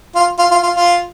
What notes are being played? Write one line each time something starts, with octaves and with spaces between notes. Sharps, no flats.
F4
F4
F4
F4
F4